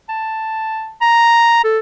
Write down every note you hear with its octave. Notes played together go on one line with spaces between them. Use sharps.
A5
A#5
A4